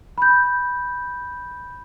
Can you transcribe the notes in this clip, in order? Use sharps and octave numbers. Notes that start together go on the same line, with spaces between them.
B5 G6